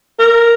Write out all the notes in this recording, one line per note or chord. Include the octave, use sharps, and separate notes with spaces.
A#4